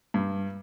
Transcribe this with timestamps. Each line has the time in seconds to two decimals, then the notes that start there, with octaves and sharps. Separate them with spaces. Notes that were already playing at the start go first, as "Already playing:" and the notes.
0.14 G2